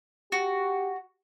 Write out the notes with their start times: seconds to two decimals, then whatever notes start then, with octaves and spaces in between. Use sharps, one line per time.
0.32 F#4 G4